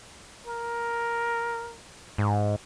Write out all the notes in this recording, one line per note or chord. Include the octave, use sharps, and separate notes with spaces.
A#4
G#2